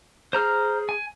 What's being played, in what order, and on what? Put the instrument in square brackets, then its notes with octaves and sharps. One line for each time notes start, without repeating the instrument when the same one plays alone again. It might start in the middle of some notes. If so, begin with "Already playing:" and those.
[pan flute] G#4 [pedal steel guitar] C5 A#5 F6
[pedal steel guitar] G#5